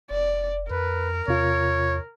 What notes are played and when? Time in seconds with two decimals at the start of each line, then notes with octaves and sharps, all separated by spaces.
0.11 F1 D5
0.70 F2 A#4 B4
1.28 E2 C3 F4 C#5